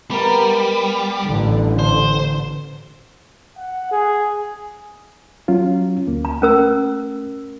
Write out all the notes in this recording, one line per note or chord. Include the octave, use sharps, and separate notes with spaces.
G3 B3 A#4 D#5
A1 D3
C5
F#5
G#4
F#3 C#4 F4
D2 A#3
A#5
A3 C#4 A#4 E6